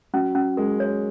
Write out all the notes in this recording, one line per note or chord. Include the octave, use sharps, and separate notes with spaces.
F#3 C#4
C#4
G#3 A#4
C#5